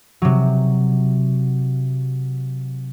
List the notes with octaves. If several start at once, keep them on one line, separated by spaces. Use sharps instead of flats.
C3 F#3